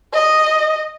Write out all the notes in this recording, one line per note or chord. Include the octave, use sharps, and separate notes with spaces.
D#5